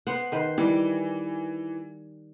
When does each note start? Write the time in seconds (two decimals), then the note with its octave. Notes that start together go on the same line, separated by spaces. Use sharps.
0.07 B3 C5 F#5
0.32 D#3 B4 C5
0.58 E3 G3